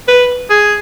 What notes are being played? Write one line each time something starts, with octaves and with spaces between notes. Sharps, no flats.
B4
G#4